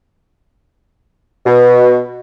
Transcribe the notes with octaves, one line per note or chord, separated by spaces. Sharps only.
B2